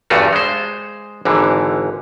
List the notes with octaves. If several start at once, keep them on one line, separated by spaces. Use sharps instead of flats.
E2 G2 G3 A3 F4 F#4
G#3 C5
G#1 G#2 D3 E3